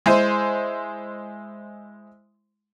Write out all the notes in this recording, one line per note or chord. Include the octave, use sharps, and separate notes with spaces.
G#3 E4 C5